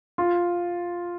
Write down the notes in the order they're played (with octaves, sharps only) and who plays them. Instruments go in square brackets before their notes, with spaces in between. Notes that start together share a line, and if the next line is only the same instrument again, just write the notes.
[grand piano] F4